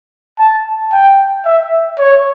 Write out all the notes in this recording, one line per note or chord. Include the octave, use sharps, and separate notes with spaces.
A5
G5
E5
C#5